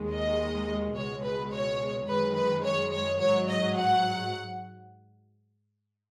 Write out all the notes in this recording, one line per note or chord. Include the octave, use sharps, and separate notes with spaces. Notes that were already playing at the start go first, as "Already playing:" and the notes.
Already playing: D#2 D#3 G#3
D#5
C#2 B2 G#3 C#5
B4
C#5
F#2 D#3 G#3 B4
B4
C#5
C#5
G#2 F#3 C#5
D#5
F#5